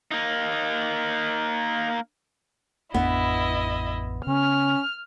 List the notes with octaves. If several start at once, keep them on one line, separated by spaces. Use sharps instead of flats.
A#3 D#4
A1 F2 B3 D4 E4 D#5
C#3 C#4 F6